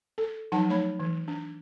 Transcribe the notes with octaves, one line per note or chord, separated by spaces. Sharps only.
A4
F3 F#3 D#4 F#5 A5
A3 D#4 C#5 B5
E3
D4